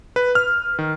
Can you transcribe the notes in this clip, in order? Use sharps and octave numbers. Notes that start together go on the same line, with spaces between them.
B4
F6
D#3